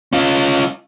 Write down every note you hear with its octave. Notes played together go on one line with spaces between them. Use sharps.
C#4 F4